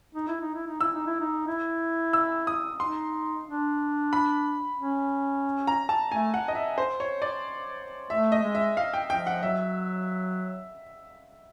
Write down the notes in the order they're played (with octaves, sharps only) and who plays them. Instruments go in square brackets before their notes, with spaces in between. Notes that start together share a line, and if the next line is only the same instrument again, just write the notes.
[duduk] D#4
E4
D#4
E4
D#4
[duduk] E4 [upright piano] E6
[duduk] D#4
E4
D#4
E4
[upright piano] E6
D#6
[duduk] D#4 [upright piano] C6
[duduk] D4
[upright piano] B5
[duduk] C#4
[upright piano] A#5
A5
[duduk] A3 [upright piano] G#5
[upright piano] F#5
D#5
E5
C5
C#5
D5
[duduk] A3 [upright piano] E5
[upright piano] D#5
[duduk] G#3
[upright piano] E5
F5
G5
[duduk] F3 [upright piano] G5
[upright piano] F#5
[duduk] F#3 [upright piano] E5